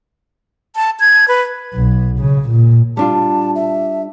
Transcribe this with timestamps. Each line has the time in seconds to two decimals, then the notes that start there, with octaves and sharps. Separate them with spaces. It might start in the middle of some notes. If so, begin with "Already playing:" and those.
0.76 A5
1.00 G#6
1.28 B4
1.74 B1
2.19 C#3
2.49 A#2
2.97 G3 D4 F4 A5
3.55 E5